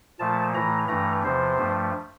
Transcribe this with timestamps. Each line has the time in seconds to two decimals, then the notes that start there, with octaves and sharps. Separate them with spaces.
0.19 A#2 F3 A3 A5
0.54 A2 E3 A3 A#5
0.88 G2 E3 A3 A#5
1.23 E2 C3 F3 C5
1.58 G2 F3 A3